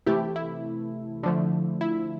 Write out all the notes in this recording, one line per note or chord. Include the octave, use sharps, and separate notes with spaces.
C3 E3 A3 E4 G4
E4
D3 F3 A3
E4